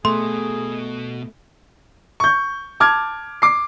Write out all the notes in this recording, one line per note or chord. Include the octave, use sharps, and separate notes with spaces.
B2 A3 B3 G#4 C6
C#6 G6
A5 D6 F6 G#6
D6 C7